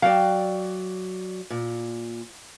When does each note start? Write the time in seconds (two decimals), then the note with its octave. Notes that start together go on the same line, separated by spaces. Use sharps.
0.02 F#3 D5 F5 G5
1.50 A#2